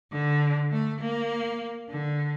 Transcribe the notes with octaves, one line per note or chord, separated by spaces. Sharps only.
D3
A3
A#3
D3